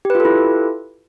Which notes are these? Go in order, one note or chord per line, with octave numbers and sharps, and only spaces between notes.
E4 F4 G4 A4 B4